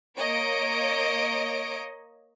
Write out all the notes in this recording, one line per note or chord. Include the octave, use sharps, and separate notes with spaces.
A#3 C#5 D#5 D7